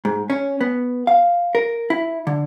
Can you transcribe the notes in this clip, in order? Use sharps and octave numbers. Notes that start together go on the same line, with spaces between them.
G#2
C#4
B3
F5
A#4
E4
D3